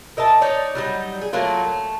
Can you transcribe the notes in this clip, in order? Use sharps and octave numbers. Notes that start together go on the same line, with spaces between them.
A#4 D#5 E5 A5
D#4 C#5 D5
F#3 G3 D#4
G#4
F#3 A3 A#3 F4
A3